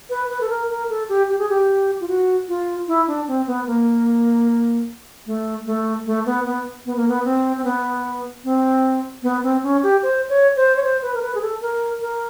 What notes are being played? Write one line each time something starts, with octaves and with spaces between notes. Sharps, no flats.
B4
B4
A4
A#4
A#4
A4
G4
G4
G#4
G4
F4
F#4
F4
E4
D4
C4
B3
A#3
A3
A3
A3
B3
B3
B3
A#3
B3
C4
C4
B3
C4
B3
C4
C#4
G4
C5
C#5
C5
C#5
C5
B4
A#4
B4
G#4
A4
A#4
A#4